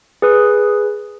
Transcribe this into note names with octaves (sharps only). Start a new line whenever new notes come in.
G#4 B4 D#6